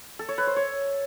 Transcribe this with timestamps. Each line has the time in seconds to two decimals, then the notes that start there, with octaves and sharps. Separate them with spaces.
0.19 A4
0.29 C#5
0.38 B4
0.47 C5
0.56 C#5